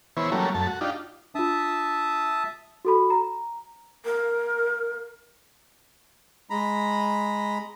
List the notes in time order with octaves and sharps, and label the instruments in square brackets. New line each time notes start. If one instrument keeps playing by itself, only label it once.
[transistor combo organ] E3 B3 E4 C5 C#5
F#3 G3 A3 A#3 C#4
F#2 A3 A5
F#4
D4 D#4 F4 G4
[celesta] D4 F4 [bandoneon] E5 A5 D#6
[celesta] F#4 A4 B5
A#5
[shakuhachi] A#4
[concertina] G#3 A#5 B5